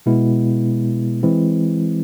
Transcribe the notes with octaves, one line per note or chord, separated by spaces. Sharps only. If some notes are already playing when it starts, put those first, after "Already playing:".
B2 G#3 B3 E4
E3 G#3 C4 E4